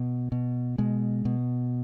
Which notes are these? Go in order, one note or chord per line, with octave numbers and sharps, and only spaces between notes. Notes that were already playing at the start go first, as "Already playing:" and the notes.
Already playing: B2
B2
B2 G#3
B2